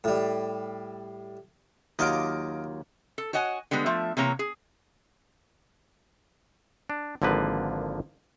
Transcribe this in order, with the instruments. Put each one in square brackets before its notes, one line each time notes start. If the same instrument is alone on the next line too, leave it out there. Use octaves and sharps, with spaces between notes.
[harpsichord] A2 G3
[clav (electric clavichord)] D#2 F#3 F4 [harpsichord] D#5 F5 D6
[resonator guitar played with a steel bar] A4
F#4 C#5 D#5 F#5 G#5
D3 G3 G#3 B3
F3 A3 E5
C3 E3 A#3 C#5 A#5
G#4
[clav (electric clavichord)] D4
G#1 D3 F3 A#3 B4